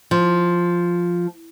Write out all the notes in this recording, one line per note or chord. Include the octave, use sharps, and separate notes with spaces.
F3